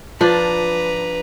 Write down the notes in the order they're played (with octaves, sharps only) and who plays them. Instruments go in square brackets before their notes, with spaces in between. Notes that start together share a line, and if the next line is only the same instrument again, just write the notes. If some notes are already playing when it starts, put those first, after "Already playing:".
[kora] F3 D4 [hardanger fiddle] B4 A#5